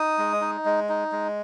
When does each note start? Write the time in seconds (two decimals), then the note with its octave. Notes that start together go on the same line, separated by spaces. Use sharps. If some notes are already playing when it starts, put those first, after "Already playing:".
Already playing: D#4 D#6
0.18 G#3
0.41 D#4
0.65 G#3
0.89 D#4
1.12 G#3